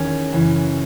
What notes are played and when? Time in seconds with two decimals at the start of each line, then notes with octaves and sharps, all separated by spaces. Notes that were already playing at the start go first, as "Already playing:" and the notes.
Already playing: E2 D#3 C#4
0.32 F#2 C#3 E3